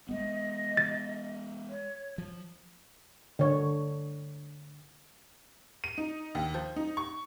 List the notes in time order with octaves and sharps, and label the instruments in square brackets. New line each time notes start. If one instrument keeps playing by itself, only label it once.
[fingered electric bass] G#3 A#3 B3 [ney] D#5
[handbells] A6
[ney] C#5
[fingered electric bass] F3
[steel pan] D3 C#5
[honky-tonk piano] D#7
D#4
D#2
F3
D#4
C#6